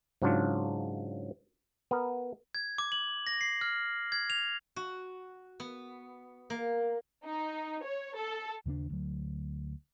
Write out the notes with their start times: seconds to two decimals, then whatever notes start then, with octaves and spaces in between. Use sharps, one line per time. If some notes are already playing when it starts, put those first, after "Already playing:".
0.22 G#2 C#3 F#3 D4 F4
1.91 B3 A#4
2.55 G#6
2.78 D6
2.92 F#7
3.27 A#6
3.41 C7
3.61 F6
4.12 G#6
4.30 F7
4.76 F#4
5.60 B3
6.50 A#3
7.24 D#4
7.84 C#5
8.16 A4
8.66 D#2 C#3 A#3 D4
8.90 D2 F#3